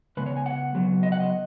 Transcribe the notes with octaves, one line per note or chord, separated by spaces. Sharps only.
C#3 G#3 B3 B4
C#5
G#5
F#5
C#3 F#3 B3
D#5
F#5
D#5